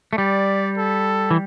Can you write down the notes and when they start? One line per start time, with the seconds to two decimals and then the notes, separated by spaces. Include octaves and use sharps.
0.13 A3
0.18 G3 D5
0.77 A4
1.31 E3